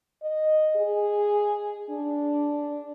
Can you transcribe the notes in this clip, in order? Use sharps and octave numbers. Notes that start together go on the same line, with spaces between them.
D#5
G#4
D4